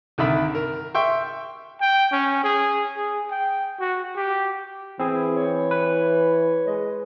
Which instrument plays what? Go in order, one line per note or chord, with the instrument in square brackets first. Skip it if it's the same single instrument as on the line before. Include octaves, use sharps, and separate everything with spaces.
[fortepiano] C2 D3 D#3 E5 B5 E6
A#4
E5 G5 C6 C#6
[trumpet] G5
C#4
G#4
G#4
G5
F#4
G4
[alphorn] E3 [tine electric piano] C4 G#4 [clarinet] E4
[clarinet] C#5
[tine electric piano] B4
[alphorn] G#3 [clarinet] D#5